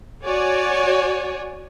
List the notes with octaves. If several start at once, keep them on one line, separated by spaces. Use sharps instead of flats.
F#4 C#5 D5 G#5